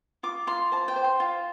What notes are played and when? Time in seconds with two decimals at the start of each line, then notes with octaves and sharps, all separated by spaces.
0.23 F4 D6
0.47 F4 C6
0.72 C5 A5
0.88 G5
0.96 C5
1.04 C6
1.20 F4